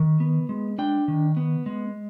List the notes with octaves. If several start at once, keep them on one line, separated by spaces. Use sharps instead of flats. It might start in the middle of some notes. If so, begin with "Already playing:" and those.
Already playing: D#3
B3
G#3
D4 G5
D#3
B3
G#3